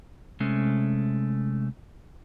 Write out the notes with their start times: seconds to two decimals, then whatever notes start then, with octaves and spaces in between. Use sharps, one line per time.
0.40 C3 G#3 A3 C#4